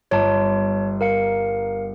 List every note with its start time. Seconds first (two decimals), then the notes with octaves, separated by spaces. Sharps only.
0.11 G1 C#5 A5
1.01 A#4 F5 C#7